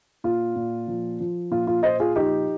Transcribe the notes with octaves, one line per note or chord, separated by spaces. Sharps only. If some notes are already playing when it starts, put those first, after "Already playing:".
A#2 F4
A#2
F3
F3
A#2 F4
F4
A#2 C5 D#5
F4 G#4
F3 D#4 G4